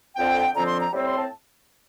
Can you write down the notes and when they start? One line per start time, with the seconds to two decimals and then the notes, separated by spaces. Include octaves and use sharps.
0.15 F2 D3 F3 C4 G5
0.54 F2 D3 F3 C4 A#5
0.67 C6
0.79 A#5
0.92 A2 G3 C4
1.06 C6
1.18 A5